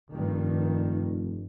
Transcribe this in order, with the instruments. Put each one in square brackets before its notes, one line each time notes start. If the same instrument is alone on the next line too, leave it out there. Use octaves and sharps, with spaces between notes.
[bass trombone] F1 [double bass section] G2 D#3